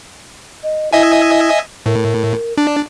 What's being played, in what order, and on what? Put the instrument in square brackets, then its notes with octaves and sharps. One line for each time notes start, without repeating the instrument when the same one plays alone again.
[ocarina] D#5
[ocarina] E4 [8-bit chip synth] D#5 E5 G#5
[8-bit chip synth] A2 [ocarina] A#4
[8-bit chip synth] D4